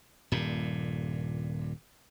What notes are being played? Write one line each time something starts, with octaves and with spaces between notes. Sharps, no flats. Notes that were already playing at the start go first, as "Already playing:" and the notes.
D#1 G2 A#2